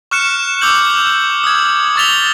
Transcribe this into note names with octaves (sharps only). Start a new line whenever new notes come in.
C#6 F6 F#6 C#7 E7
D6 E6 G6 F#7
D#6 G#6
C#6 E6 A6 B6 F7 G7